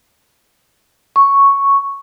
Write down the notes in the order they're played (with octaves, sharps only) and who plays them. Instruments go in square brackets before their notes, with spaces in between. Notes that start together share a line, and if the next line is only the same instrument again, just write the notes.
[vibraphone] C#6